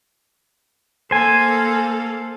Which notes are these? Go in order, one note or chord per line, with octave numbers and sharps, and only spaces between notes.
A#3 A4 C5 G#5